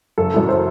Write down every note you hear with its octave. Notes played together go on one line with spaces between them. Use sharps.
F#1 A4
F#2 E3
C5